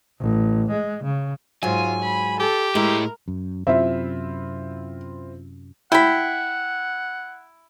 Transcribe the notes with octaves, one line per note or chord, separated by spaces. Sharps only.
A1
G#3
C#3
G#2 F#3 F4 G#5
B5
G4 A4
A2 G#3 E4 A#4
F#2
F#2 C3 C4 E4 F4 E5
E4 F#5 G5 B5